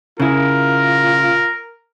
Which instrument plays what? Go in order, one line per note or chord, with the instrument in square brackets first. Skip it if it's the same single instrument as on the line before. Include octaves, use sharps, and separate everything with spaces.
[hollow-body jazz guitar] C#3 E4 [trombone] F4 [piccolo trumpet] A#4